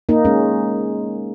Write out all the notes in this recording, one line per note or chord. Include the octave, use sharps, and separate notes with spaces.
A#3 D#4
G#3 C#4